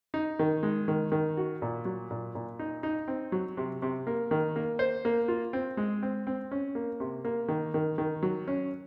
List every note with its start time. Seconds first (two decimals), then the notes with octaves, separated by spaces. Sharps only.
0.14 D#4
0.39 D#3
0.63 G#3
0.88 D#3
1.12 D#3
1.37 F#4
1.62 A#2
1.85 F#3
2.11 A#2
2.35 A#2
2.59 D#4
2.83 D#4
3.08 C4
3.32 F#3
3.57 C3
3.82 C3
4.07 A#3
4.31 D#3
4.56 A#3
4.79 C5
5.05 A#3
5.28 F4
5.53 C4
5.77 G#3
6.03 C4
6.27 C4
6.51 C#4
6.75 A#3
7.00 C3
7.25 A#3
7.49 D#3
7.74 D#3
7.98 D#3
8.23 F#3
8.48 C#4